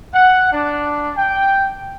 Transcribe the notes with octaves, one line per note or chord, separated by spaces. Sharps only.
F#5
D4
G5